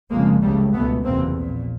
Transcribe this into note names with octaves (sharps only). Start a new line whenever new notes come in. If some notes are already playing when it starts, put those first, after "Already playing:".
F1 F2 C#3 G#3 A#3
C#2 C#3 G3 A3
C#2 B2 A3 B3
F#1 E2 C3 A#3 C4
A#1 A#2